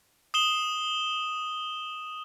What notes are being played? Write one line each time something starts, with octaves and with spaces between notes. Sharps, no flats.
D#6 E7 G7